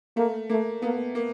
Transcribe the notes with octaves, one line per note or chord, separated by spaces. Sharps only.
A3 A#3
A3 A#3
A#3 B3
A#3